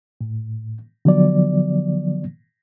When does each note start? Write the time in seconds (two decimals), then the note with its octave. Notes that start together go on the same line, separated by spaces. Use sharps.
0.21 A2
1.05 D3 F3 F#3 B3 D5